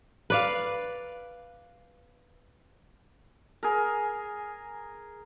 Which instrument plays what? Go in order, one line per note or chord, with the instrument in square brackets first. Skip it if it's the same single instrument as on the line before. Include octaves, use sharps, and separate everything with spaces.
[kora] B4 D5 F5
[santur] G#4 A#4